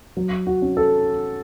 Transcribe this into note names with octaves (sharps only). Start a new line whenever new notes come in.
F#3
F#4
C#4
A4